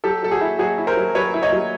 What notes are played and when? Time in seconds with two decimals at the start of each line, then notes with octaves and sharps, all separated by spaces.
0.04 F#3 G4 A4
0.23 F#3 A4
0.31 F#4 G#4
0.41 E4
0.59 F#3 F#4 G#4
0.78 E4
0.87 A#4 C5
0.97 F#3
1.15 F#3 B4 C#5
1.34 E4
1.43 C#5 D#5
1.52 F#3